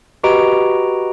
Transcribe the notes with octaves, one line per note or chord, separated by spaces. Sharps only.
F#4 G4 B4 D#5 A#5 D7